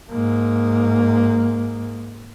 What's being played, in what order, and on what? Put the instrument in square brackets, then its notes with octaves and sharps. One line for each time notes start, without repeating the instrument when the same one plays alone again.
[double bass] G#2 A#3